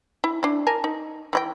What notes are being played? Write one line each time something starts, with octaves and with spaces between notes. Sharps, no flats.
E4
D4 E4
A#4 G#5 A5
D#4
E3 E4 G5